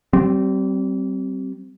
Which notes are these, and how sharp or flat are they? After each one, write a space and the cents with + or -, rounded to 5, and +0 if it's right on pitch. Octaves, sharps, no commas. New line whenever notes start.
G3 -30 C4 +0